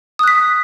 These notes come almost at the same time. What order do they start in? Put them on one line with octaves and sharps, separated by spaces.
D#6 F#6 B6